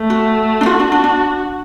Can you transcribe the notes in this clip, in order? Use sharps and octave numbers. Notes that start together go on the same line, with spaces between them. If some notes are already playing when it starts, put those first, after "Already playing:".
Already playing: A3
F#4
D4
F4 F#4
D4
D4
D4